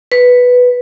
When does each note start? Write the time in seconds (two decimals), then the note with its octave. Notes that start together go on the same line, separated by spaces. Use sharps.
0.12 B4